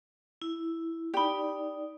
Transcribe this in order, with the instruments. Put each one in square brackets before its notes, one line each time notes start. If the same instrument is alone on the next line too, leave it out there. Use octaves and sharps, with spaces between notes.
[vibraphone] E4
[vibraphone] D#4 D5 [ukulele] G4 B5